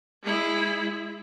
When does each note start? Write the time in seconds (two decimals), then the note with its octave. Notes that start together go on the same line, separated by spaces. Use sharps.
0.24 G#3 E4